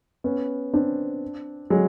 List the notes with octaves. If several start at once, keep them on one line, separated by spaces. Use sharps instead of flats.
B3 C#4
C4 D4
F#3 G#3